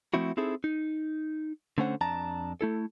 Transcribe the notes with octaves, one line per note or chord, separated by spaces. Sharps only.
F3 A3 C4 E4 F#4
C4 D#4 E4 G#4 A4
D#4
D3 A3 C#4 C5 F#5
F2 D4 A5 A#5
A3 E4 A4